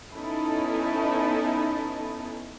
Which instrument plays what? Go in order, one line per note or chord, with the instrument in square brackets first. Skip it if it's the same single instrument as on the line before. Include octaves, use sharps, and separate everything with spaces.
[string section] B3 C#4 D#4 E4 A4